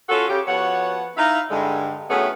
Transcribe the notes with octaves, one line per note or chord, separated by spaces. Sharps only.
C#4 F4 F#4 A4
C#3 G4
F3 B3 F#4 C#5 F#5
D#4 E4 F5
G2 D3 G#3
A2 F#3 A3 B3 C#4 G#4